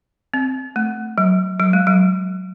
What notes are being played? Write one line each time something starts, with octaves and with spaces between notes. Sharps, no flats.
C4
A3
F#3
F#3
G#3
F#3